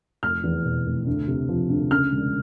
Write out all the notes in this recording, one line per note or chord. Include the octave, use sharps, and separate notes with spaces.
F1 F6
E2
B2
F1
D2
C3
F3
D2
C#3 F6
E1